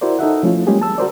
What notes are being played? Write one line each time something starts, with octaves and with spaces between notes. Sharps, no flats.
E4 F#4 A#4 C5 D5
D#4 A4 E5 F#5
F3 A3 C#4 E4 F4
G3 G#3 A#3 C#4 G4 G#4
A5 E6
F#4 A#4 C5 D5